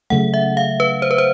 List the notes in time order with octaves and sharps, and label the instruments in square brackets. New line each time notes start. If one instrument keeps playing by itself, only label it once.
[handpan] C#3 F#3 A3 [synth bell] F#5
[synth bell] E5
F5
B4
C5
B4
C5